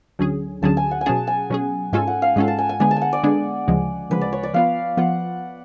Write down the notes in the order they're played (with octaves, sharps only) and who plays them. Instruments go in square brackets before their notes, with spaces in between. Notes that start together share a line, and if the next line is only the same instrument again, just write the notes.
[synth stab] D2 D3 F#3 C#4 G#4
[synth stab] D2 D3 F#3 C#4 G#4 [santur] A5
[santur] G#5
F#5
G#5
[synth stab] B2 F#3 C#4 G#4 [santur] A5
[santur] G#5
[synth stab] B2 F#3 C#4 G#4
[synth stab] G#2 G#3 C#4 F4 A4 [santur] G#5
[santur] F#5
F5
[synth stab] G#2 G#3 C#4 F4 A4 [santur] F#5
[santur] A5
G#5
G#5
[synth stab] D3 G#3 B3 D4 G#4 [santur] G#5
[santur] A5
G#5
F#5
D5
[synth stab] D3 G#3 B3 D4 G#4
D2 C#3 F3 G#3
[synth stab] D2 C#3 F3 G#3 [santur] B4
[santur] D5
C#5
D5
[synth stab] F3 B3 F4 [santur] F5
[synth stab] F3 B3 F4 [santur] F#5